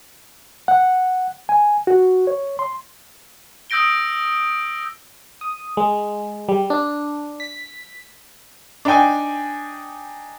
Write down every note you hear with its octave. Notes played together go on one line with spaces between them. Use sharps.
F#5
G#5
F#4
C#5
C6
D#6 E6 G6 A#6 D7 G7
D#6
G#3
G3
D4
B6
D4 D#4 G5 G#5